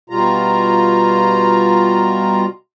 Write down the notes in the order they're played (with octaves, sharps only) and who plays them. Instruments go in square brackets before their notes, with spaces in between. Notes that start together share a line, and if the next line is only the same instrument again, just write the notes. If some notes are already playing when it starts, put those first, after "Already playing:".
[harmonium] B2 G3 F4 A#5